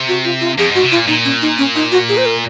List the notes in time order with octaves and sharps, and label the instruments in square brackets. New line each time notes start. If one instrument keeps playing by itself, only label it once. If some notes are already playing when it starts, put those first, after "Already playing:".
Already playing: [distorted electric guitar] C3
[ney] F#4
F4
F4
[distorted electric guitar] F2 [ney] G#4
[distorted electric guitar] G#2 [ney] F#4
[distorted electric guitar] C3
[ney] F4
[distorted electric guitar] A#2
[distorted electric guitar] A#2 [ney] D#4
[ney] C#4
D#4
C#4
D#4
F#4
G#4
C5
A#4